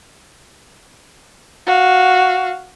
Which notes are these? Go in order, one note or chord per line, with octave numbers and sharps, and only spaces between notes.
F#4 F5